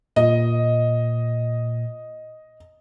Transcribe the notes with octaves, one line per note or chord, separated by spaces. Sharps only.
A#2 D#5